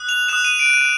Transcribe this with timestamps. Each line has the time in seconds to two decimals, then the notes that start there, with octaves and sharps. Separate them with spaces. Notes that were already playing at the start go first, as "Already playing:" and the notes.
Already playing: D#6 F#6
0.09 F7
0.28 D#6 F#6 E7
0.45 D#7
0.59 D7
0.73 D#7